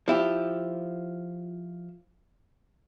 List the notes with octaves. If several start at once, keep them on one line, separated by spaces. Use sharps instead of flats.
F3 E4 G4